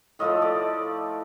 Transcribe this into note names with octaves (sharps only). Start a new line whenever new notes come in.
A2 F3 A3 D#5
D5